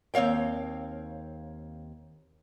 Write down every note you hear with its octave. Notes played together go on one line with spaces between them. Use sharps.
D#2 C4 C#5 F5 G5